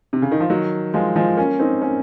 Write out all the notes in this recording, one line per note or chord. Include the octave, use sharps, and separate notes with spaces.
C3
C#3
D#3
F3
D#3 F#3
F3 G#3
F3 G#3
A#3 C#4
C4 D#4
A#3 C#4